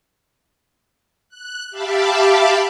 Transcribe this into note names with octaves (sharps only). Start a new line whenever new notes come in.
F#6
G4 E5 F5 A5 B5 D6